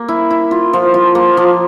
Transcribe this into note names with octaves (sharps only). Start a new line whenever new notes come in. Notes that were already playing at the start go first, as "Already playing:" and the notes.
Already playing: A#3
E4
E4
F4
F3
F4
A#3
F3